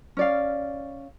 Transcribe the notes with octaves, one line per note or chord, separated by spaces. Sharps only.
C#4 D5 F5